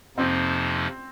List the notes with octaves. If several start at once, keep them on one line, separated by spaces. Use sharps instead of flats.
F2 C3 F3 A#3 C4 D#4